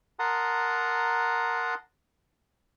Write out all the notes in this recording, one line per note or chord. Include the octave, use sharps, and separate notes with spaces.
A#4 F#5 A5 A#5 C6 D#6